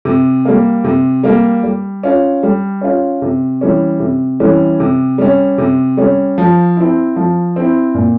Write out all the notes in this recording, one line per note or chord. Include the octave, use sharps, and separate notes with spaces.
C3
G3 A#3
C3
G3 A#3
G3
C#4 F4
G3
C#4 F4
C3
E3 G3 C#4
C3
E3 G3 C#4
C3
G3 C#4
C3
G3 C#4
F3
C4 E4
F3
C4 E4
A#2